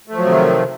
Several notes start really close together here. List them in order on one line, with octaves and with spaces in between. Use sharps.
A3 F3 F#3 C3 D#3